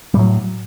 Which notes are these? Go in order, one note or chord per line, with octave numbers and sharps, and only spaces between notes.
A2 F#3 G3